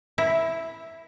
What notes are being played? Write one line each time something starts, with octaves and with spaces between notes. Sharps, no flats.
E4